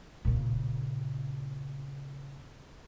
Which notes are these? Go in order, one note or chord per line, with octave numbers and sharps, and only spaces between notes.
A#2 C#3